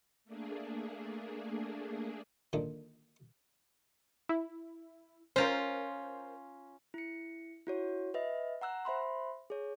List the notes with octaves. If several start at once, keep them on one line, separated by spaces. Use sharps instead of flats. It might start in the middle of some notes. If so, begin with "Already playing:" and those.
A3 A#3 D4 G#4
A#2 D3 D#3 D4
E4
C#4 F4 A#4 C5
E4 C#7
E4 F#4 C#5
B4 D#5 E5
F#5 A#5 E6 F#6
C5 E5 B5 C6
G#4 C#5